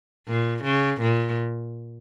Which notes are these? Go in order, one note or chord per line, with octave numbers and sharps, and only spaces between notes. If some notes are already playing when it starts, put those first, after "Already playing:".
A#2
C#3
A#2